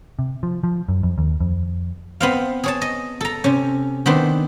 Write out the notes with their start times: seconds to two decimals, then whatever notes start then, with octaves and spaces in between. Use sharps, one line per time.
0.19 C3
0.43 F3
0.64 F3
0.89 F#2
1.03 F2
1.18 D#2
1.40 F2
2.20 B3 C4 F5
2.64 G#4 C#5 A5
2.81 D#5
3.21 A4 A#5
3.44 C3 C#4
4.06 D#3 B3 C4 D4